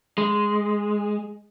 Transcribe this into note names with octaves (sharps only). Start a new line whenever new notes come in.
G#3